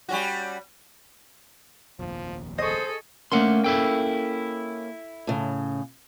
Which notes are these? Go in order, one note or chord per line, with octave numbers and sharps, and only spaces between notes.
G3 C#4 F#4
F1 A#1 D#2 F3
G#4 A4 C5 D#5 C#6
A3 A#3 C#4 F#5 C6
E4 A4 G5
A2 C#3